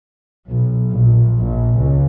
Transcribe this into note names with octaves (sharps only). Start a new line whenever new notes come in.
B1
A#1
A#1
C#2